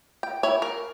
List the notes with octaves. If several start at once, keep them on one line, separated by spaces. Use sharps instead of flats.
G5
E4 C#5
A#4